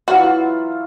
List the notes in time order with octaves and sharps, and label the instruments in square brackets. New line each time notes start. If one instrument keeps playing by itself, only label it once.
[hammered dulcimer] E3 F#3 F4 [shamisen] F#4